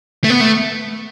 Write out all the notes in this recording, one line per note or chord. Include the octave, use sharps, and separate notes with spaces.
A3
B3
A3